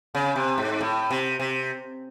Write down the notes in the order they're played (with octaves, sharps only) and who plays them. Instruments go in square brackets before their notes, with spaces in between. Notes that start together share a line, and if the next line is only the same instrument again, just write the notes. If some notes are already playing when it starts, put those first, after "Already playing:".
[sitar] C#3
C3
G#2
A2
C3
C3